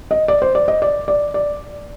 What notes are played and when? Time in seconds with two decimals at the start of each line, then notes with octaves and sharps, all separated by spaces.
0.11 D#5
0.28 D5
0.42 C5
0.55 D5
0.68 D#5
0.82 D5
1.08 D5
1.34 D5